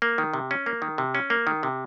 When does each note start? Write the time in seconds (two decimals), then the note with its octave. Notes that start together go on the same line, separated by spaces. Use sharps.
0.02 A#3
0.18 D#3
0.34 C3
0.51 C#4
0.66 A#3
0.82 D#3
0.98 C3
1.15 C#4
1.30 A#3
1.47 D#3
1.63 C3